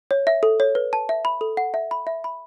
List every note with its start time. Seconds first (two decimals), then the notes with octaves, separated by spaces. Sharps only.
0.11 C#5
0.27 E5
0.43 A4
0.60 C#5
0.75 B4
0.93 A5
1.09 E5
1.25 B5
1.41 A4
1.57 F#5
1.74 E5
1.91 B5
2.07 E5
2.24 B5